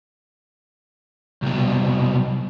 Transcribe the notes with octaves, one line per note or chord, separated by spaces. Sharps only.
C2 B2